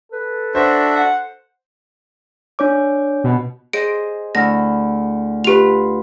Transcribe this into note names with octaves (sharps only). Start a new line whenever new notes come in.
A4 B4
D4 F#4 C5 E5
F#5
D4 C#5 D6
B2
G#4 C5 D#5 D7
D2 E4 F6 A#6
F4 G4 B4 F7